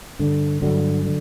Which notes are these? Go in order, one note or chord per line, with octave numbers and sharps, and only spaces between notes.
G2 D3
G2 D3 F#3
D3